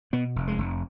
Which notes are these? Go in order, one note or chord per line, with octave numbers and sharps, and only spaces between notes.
B2 B3
F1
G#3
F1